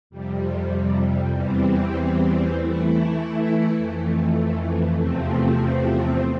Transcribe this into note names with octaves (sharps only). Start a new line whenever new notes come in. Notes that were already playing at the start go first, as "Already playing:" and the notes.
F2 C3 G3
E2 E3 G3 C4
E3 A3 E4
F2 E3 A3
E2 C3 F3 A3 C4